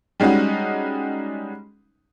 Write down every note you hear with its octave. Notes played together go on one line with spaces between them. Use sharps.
G3 G#3 C#4 D#4 F#4